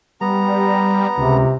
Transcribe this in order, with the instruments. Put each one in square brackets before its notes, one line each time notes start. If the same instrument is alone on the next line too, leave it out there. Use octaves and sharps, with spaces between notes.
[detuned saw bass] G3 [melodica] B3 A#5
[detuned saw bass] C#2 [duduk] C3